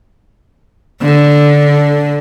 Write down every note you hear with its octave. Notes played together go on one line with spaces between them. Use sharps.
D3